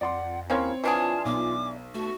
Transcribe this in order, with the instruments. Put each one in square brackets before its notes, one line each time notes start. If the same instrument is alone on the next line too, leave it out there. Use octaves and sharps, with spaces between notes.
[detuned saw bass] F2 [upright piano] D5 C6 [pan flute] F#5
[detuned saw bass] D#2 [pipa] A#3 C#4 [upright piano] C4 C#5 C6 [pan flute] E4
[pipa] E3 D4 G#4 [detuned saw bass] F4 [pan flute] A5
[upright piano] B1 [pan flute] D6
[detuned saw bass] A3 [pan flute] F#4